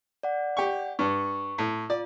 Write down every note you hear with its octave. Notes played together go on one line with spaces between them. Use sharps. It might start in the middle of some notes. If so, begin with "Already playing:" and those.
D5 F#5
G4 C#6
G2 C#6
A2
F4 D5